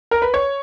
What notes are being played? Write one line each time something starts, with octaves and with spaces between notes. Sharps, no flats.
A#4
B4
C#5